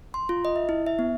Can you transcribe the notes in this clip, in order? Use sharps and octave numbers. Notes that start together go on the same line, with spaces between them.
C6
F4
D#5
E5
E4
E5
B3